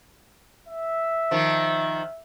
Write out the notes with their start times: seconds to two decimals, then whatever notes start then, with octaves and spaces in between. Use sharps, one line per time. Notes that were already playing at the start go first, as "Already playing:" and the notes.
0.68 E5
1.31 D#3 F3